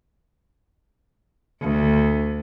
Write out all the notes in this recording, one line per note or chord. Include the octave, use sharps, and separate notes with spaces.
D2